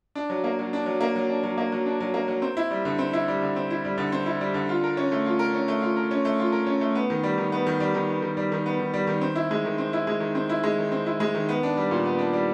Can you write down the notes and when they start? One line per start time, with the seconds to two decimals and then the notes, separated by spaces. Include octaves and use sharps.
0.15 D4
0.30 F#3
0.44 A#3
0.59 F#3
0.73 D4
0.86 F#3
1.01 A#3
1.16 F#3
1.29 D4
1.43 F#3
1.58 A#3
1.72 F#3
1.86 D4
2.01 F#3
2.14 A#3
2.28 F#3
2.42 C4
2.57 E4
2.71 G3
2.85 D3
2.99 C4
3.13 E4
3.28 G3
3.42 D3
3.56 C4
3.71 E4
3.85 G3
3.98 D3
4.12 C4
4.26 E4
4.41 G3
4.54 D3
4.69 F4
4.84 A#4
4.97 C#4
5.12 A3
5.26 F4
5.39 A#4
5.54 C#4
5.68 A3
5.82 F4
5.96 A#4
6.11 C#4
6.25 A3
6.39 F4
6.52 A#4
6.67 C#4
6.81 A3
6.95 B3
7.10 D#3
7.23 G3
7.38 D#3
7.52 B3
7.67 D#3
7.80 G3
7.94 D#3
8.09 B3
8.22 D#3
8.37 G3
8.52 D#3
8.66 B3
8.80 D#3
8.94 G3
9.07 D#3
9.21 C4
9.35 E4
9.51 G#3
9.65 D#3
9.78 C4
9.93 E4
10.07 G#3
10.20 D#3
10.35 C4
10.49 E4
10.63 G#3
10.78 D#3
10.92 C4
11.06 E4
11.20 G#3
11.34 D#3
11.49 B3
11.63 D4
11.77 G3
11.91 A#2
12.06 B3
12.19 D4
12.33 G3